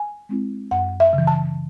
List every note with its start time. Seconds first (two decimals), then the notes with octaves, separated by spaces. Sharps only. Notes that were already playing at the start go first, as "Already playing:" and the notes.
Already playing: G#5
0.29 G#3 C4 E4
0.71 F#2 F#5
1.00 E5
1.13 C#3
1.18 E3
1.27 A5